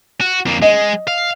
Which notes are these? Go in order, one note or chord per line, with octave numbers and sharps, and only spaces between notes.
F#4
F2 A#3
G#3 D#5
F5